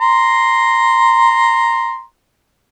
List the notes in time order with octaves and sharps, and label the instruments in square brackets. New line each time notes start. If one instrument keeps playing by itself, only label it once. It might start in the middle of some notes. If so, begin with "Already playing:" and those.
[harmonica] A#5 C6